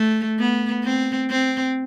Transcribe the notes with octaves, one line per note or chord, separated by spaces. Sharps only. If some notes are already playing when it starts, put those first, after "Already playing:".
Already playing: A3
B3
C4
C4